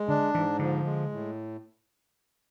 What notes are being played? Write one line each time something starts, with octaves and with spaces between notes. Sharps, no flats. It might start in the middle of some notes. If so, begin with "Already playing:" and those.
Already playing: G#3
D3 D4
G#2 E3
D3 F3
G#3
A2